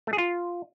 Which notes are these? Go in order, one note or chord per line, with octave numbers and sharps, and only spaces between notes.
A3
G#4
F4